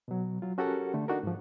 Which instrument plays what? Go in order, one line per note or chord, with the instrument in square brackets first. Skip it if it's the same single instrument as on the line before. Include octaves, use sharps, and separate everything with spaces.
[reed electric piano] B2 F#3
F#3 F4
C#4 F#4 G4 A4 A#4 F#5
D3 A3
D4 D#4 F#4 A4 A#4
G#2 F3